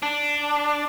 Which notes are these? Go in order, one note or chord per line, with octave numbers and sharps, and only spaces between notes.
D4